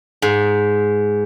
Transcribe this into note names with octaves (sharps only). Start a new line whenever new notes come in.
G#2